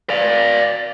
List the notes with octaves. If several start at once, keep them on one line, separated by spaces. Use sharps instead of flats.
D5 F5